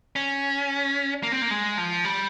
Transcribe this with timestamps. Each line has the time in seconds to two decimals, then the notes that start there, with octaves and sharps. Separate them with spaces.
0.16 C#4
1.23 A#3
1.32 C4
1.42 A#3
1.50 G#3
1.78 F3
2.05 G3